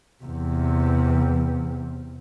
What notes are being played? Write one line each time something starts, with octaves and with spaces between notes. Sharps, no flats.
E2 C3